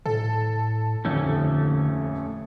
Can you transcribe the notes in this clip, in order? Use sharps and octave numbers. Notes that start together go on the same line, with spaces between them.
A2 A4
D#1 B1 F2 D3 A3 C#4